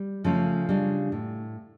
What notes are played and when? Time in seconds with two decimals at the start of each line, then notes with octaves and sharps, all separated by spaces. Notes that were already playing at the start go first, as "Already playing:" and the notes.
Already playing: G3
0.24 C#3 F3 A3 C#4
0.69 C#3 G3 D4 F4
1.12 A2